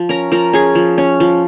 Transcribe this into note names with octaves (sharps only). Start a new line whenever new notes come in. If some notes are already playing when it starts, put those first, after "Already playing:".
Already playing: F3
C#4 A#4 A#5
F3 A#4 A#5
C#4 G#4 G#5
F3
C#4
F3